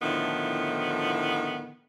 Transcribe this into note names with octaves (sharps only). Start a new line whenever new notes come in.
A2 D3 D#3 F3 B3 E4